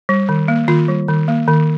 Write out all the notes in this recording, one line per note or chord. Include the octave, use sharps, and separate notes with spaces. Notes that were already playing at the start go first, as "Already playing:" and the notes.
G3
D#3
A#3
D#3 F4
G3
D#3
A#3
D#3